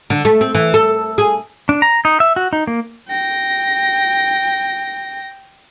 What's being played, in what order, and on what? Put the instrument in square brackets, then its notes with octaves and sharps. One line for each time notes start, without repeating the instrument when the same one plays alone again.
[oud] D3
A3
C4
E3
A4
G#4
[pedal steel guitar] D4
A#5
D#4
E5
F#4
D#4
A#3
[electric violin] G5 A#6